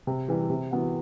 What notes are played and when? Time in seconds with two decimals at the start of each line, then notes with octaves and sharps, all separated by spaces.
0.07 C3
0.28 E3 G3
0.50 C3
0.71 E3 B3 F#4